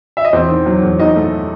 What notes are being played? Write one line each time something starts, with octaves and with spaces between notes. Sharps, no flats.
E5
D#5
E2 C4 C5
D#3
F#3
E2
E2 D#4 D#5
A3